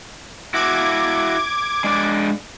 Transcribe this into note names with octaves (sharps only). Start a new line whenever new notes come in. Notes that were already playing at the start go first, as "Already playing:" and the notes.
E4 F#4 D6 G#6
G#3 D4 D5